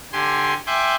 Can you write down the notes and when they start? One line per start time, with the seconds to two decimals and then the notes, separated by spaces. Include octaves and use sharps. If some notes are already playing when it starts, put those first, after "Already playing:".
0.13 D3 G4 G#5 C6
0.66 E5 G5 G#5 C6 D6 F#6